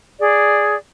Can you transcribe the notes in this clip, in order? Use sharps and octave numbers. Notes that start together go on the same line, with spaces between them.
G#4 D5